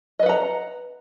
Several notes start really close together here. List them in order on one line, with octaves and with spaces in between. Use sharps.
D#5 B4 F#5 A#5